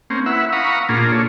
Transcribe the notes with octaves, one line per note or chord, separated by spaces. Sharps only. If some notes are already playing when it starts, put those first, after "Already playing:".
A#3 C4 C#4
E4 B4 E5 F#5
F5 F#5 A#5 B5 C#6 D#6
A#2 A#3 D4 F4 G#4
D4 A4 C#5